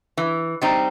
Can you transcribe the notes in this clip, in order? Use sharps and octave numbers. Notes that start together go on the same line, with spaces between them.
E3
G3 C4 D#4